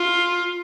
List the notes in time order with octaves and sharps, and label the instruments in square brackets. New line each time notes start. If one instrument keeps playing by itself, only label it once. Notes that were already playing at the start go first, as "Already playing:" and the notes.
Already playing: [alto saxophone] F4